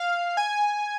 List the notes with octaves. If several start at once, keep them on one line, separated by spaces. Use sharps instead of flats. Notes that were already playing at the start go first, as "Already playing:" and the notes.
Already playing: F5
G#5